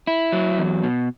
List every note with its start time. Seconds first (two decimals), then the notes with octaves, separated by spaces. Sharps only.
0.07 E4
0.32 F#3
0.58 E2
0.83 B2